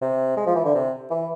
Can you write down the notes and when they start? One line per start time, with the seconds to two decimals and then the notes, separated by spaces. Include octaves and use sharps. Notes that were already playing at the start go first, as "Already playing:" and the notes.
0.02 C3
0.37 G#3
0.46 F3
0.55 E3
0.65 D3
0.75 C3
1.11 E3